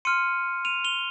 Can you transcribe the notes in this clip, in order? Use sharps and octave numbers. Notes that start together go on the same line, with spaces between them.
C6 F6 C#7 D#7
D#7 F7
F7 G7